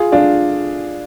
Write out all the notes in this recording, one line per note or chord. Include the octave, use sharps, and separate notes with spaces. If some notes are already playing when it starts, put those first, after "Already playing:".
Already playing: F4 G#4
D4 F4